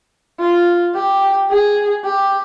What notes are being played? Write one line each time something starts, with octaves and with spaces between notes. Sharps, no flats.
F4
G4
G#4
G4